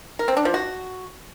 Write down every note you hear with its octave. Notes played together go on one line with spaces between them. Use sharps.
A#4
C4
D4
F3
F#4